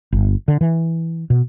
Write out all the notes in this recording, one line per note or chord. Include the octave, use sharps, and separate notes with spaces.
G1
D3
E3
B2